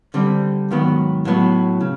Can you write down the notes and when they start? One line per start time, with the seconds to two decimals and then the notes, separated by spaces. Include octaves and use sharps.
0.14 D3 G3 C4
0.71 G#2 D#3 F#3 B3
1.25 A2 F#3 B3
1.81 C#3